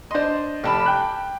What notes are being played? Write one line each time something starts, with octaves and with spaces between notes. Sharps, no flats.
D4 C5 D#5 C6
F1 G4 A5 B5
G5 F#6